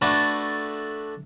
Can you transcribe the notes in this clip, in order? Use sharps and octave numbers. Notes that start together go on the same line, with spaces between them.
A3 D4 F#4 A4 B4